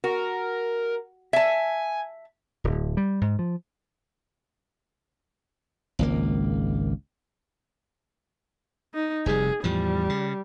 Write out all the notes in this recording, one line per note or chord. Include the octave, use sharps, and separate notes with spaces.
F#4 A#4
E5 G#5 A5
D1
G3
G#2
F3
G#1 C#2 A#3
D#4
F1 C3 G3 G#4
E2 A2 F3 G3
C#3